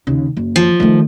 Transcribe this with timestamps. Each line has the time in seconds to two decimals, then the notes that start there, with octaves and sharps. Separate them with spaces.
0.07 D#2 C#3
0.37 F#1
0.56 F3
0.80 D#3 A3